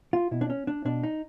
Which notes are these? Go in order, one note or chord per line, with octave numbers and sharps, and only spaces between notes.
F4
B2 E4
D4
C#4
D4
B2 D4
D#4